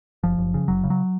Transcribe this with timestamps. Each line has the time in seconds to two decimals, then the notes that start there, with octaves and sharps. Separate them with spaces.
0.24 F#1 F3
0.38 F#1
0.54 C#3
0.68 F#1 F#3
0.84 C#3
0.90 F#3